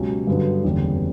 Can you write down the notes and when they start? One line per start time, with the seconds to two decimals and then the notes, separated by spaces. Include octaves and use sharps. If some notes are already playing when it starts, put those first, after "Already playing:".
Already playing: C#2 B2 F#3 C#4 G4
0.27 G2 D3 F#3 B3
0.64 F#1 E2 D3 G3